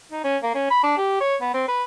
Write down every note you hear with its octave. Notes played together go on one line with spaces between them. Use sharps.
D#4
C#4
A#3
C#4
B5
D4
G4
C#5
B3
C4
B4